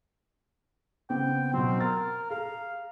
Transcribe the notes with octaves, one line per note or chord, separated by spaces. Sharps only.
C#3 B3 C4 G5
B2 F#3 C4
A#4 A6
G#4 F5 A#5